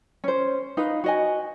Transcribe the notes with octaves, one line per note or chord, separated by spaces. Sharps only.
C#4 C5
D#4 B4 F5
F#4 D#5 G#5